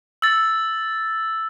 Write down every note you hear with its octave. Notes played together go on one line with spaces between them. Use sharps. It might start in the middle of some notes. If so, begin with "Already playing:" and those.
E6 A6